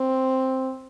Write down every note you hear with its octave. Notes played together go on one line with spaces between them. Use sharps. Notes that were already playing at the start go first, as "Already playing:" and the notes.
Already playing: C4